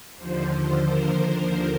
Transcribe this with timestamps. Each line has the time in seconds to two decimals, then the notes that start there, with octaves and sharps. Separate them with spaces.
0.17 D#2 D3 F3 C5
0.51 C5
0.86 A#4